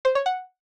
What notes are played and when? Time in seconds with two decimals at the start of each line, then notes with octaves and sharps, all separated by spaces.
0.05 C5
0.15 C#5
0.26 F#5